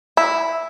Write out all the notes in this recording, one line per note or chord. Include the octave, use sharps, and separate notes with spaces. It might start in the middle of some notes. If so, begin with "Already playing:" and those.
E4